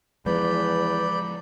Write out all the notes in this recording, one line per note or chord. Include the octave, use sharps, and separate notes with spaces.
E2 F3 G#3 B4 D5 B5 G6